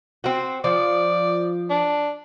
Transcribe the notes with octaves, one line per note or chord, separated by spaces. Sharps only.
C4 F#4
F3 D5
D4